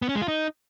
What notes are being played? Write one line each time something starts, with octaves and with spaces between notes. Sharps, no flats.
B3
C#4
G#3
F4
D#4